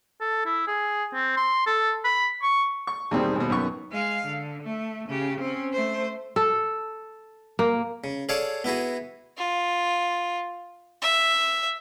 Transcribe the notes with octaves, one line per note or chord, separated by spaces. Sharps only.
A4
E4
G#4
C4
C6
A4
B5
C#6
C#6
E2 B2 D#3 G3 C4
D#2 B2
F#2 D#3 B3 C#6
G#3 F5
D3
A3
C#3 G4
C4 C#4
A3 C5
A4
A#3
C#3
G#4 A4 C#5 D5 F5 A5
B3 E4 F#4 G#4
F4
E5